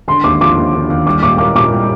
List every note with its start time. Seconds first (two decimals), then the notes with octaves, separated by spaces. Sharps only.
0.08 D3 C6
0.24 D#2 D6
0.41 F3 D6
0.57 D#2
0.73 D3
0.90 D#2
1.06 G3 D6
1.23 A#2 D6
1.38 A#3 D6
1.55 A#2 D6
1.72 G3